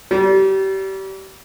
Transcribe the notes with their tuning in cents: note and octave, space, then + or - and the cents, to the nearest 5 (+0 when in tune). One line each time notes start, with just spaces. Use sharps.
G3 -30